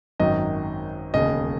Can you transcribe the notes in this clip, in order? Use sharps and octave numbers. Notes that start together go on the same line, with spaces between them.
G#1 F#2 D#3 F#3 D#5
E1 D#2 C#3 D#5